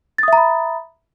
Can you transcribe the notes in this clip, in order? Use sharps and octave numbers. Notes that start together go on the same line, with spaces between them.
E5 A#5 B5 D#6 A6